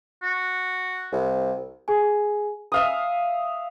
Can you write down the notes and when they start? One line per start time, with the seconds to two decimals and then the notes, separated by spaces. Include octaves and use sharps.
0.23 F#4
1.12 C2
1.88 G#4 G#5
2.72 E5 F5 D#6